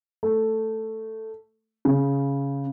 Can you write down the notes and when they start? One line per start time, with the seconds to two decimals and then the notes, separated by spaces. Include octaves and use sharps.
0.23 A3
1.85 C#3